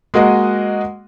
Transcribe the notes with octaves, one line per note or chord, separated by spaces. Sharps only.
G#3 A#3 F#4 D#5 F#5